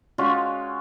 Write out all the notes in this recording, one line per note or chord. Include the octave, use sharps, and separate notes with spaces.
G#3 C#4 F4 F#4